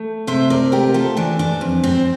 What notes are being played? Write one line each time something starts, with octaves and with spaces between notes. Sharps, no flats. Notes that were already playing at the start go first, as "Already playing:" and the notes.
Already playing: A3
C3 C5 E5
A#4 D5
A3 G4 A#4
F4 A4
E3 D4
D4
F2
C4